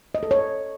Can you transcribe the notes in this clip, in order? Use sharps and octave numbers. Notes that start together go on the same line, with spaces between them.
D#5
A4
C#5